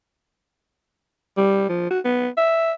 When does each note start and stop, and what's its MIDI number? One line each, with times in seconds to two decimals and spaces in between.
1.37 1.65 55
1.69 1.89 53
1.90 1.99 66
2.04 2.28 59
2.37 2.72 76